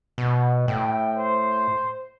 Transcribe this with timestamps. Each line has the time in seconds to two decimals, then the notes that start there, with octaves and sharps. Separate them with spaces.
0.18 B2
0.68 A2 G5
1.17 C5